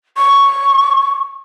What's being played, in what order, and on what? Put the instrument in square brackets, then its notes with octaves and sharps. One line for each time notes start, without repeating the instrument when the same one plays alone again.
[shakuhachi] C#6